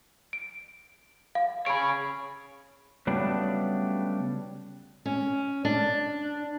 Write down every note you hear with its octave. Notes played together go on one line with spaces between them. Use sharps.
D7
F5
G#4 C#5 B5 D7
C#3 F#3 G3 A3 B3 D4
C#4
D4